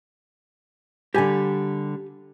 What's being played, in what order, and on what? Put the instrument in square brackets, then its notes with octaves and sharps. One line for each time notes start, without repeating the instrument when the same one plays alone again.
[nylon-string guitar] D3 G3 [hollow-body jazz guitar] G4 G#5